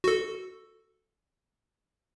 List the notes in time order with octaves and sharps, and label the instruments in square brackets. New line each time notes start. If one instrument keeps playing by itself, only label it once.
[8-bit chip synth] F#4 A4